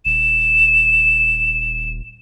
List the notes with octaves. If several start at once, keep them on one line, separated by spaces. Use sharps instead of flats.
D#1 E7